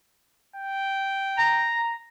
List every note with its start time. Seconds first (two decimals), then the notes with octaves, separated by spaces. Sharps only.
0.56 G5
1.37 A#5